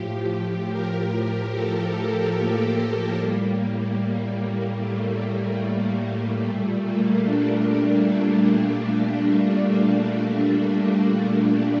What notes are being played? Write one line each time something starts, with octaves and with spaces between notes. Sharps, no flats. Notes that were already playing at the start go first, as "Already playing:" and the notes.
Already playing: A2 F3 G4
A#4
A4
G4
A#3
A2 G3
A3
A#2 G3 A3
A#3
D4